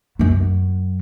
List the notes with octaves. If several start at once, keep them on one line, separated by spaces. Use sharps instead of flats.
F#2 F#3